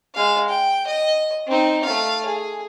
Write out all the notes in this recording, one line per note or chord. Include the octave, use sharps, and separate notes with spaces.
G#3 F5
G5
D#5
C4 D#4
A3 F5
G#4